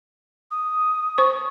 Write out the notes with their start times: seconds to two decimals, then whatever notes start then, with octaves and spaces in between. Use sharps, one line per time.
0.51 D#6
1.18 C5 C#6